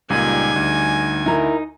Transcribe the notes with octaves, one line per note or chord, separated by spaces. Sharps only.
C#2 A#2 G3 D#4 G#5
D2
D#4 E4 A#4